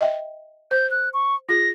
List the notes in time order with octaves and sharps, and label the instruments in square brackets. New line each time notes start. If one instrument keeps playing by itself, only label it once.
[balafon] D#5 E5 G5
[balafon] C5 [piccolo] G6
[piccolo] F#6
C#6
[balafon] F4 G#4 [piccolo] A#6